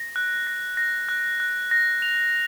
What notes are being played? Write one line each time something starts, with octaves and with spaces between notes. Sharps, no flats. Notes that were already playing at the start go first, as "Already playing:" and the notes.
Already playing: A#6
F#6
A#6
A#6
F#6
F#6
A#6
F7